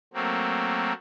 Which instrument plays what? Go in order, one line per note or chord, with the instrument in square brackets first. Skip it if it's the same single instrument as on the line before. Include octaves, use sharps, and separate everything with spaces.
[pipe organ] F#3 A3 A#3 C4